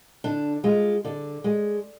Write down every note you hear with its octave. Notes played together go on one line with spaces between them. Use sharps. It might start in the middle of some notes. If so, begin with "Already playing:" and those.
D3 D4
G#3 F4
D3 D5
G#3